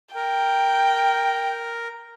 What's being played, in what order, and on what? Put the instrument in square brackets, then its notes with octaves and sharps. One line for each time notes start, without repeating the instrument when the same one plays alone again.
[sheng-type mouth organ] A#4 [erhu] G5